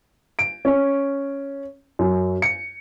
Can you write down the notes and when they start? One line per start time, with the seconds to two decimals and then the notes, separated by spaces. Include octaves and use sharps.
0.39 D7
0.65 C#4
1.99 F#2
2.42 C#7